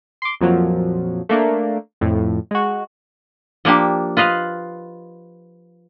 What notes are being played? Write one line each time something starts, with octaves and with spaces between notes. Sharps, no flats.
C6 D6
F2 A#2 F3 F#3
A3 A#3 D4
F2 A2
G#3 F#4
F3 A#3 D4 G4
F4 B4 D#5 F5